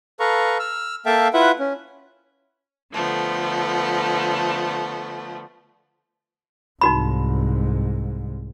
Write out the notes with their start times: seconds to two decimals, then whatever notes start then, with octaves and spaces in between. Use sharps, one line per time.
0.20 A4 B4 F5 A#5 C#6
0.59 E6 F6
1.06 A#3 A4 E5 F5 G5 A5
1.34 E4 F4 B4 E5 F#5
1.59 C#4
2.92 D3 F3 A3 B3
6.81 C2 G#2 D#4 F#4 B5